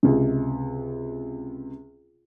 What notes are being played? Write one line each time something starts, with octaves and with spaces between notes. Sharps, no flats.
C#2 C3